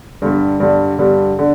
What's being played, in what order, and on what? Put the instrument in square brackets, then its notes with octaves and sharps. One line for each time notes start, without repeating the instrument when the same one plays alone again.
[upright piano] G2 D3 G3
G2 D3 G3
G2 D3 G3
D3